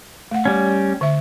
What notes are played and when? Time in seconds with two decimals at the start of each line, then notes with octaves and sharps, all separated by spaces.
0.31 A3 F#5
0.45 G3 C#4
1.01 D3 E5